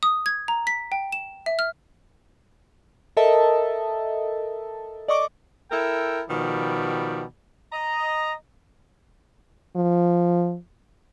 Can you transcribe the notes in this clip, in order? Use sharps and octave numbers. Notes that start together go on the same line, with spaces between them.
D#6
G#6
A#5
B6
G5
E7
E5
F6
A4 A#4 D#5 E5 A5
D5 D#5 C#6 D6
E4 A4 A#4 G5
B2 D#3 F3 G3
D#5 A#5
F3